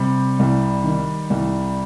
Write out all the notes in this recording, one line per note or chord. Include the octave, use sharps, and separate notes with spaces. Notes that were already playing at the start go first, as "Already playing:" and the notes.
Already playing: C3 G3
C2
D#3
C2